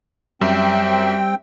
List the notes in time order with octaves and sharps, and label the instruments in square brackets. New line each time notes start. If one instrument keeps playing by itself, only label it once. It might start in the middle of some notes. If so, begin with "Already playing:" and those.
[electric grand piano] F#2 [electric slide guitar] G3 [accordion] C4 G5 [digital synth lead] E5